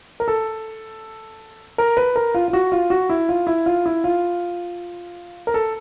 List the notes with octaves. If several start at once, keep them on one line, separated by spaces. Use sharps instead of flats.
A#4
A4
A#4
B4
A#4
F4
F4
F#4
F4
F#4
E4
F4
E4
F4
E4
F4
A#4
A4